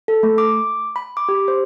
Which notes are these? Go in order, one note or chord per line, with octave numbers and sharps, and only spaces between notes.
A4
A3
D6
B5
D6
G4
C5